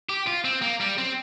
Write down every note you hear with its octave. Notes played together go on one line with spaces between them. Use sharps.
G4
F4
C4
A#3
G3
C4